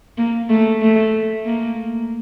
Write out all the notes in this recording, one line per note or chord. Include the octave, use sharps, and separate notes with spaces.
A#3
A3
A3
A#3